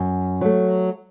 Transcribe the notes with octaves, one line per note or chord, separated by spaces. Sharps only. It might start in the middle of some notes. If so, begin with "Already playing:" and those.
Already playing: F#2
F#3 A3